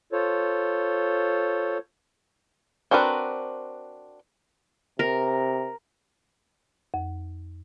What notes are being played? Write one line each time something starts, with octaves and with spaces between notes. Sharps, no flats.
F4 A4 C5 C#5
C4 D4 F#4 A#4 B4
C3 A#4
F2